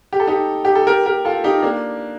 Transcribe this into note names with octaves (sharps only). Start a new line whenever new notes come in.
G4
A4
D#4 G4
G4
A4
G4 A#4
G4 A#4
F4 A4
D#4 G4
A#3 D4